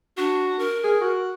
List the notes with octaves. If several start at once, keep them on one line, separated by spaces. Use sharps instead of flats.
D4 F#4
A#4
G#4
F#4